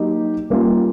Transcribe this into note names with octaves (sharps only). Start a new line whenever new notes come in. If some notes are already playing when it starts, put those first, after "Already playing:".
Already playing: F#3 A#3 D#4 G4
G3 A#3 C#4 F4